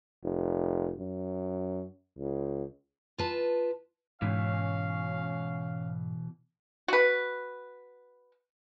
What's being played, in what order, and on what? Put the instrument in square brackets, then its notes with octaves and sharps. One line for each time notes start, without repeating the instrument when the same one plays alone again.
[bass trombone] F1
F#2
C#2
[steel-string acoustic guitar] F4 B4 A5
[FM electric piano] G#2 [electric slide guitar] B2 E3 [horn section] C#4 F5
[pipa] F#4 B4